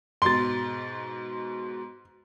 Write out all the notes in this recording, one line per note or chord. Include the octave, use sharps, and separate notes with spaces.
G#2 B2 C6 A6